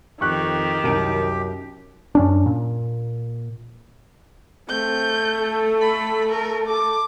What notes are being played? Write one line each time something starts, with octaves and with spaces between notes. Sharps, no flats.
F2 D#3 G4 C#6 F#6
C2 F#2 A#4 D7
F#2 C#4 D4
A#2
A3 C4 G6
A4
B5
A#4
A4 D6